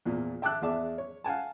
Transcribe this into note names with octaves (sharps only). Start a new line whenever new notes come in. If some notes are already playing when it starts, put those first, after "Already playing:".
E2 A#2 F3
E5 G5 A5 D6 E6 F#6
E2 G#4 D5 E5 A5 D6
C#5
F5 F#5 G#5 A5